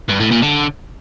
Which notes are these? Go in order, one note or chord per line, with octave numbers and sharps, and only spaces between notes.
G2
A2
A#2
D3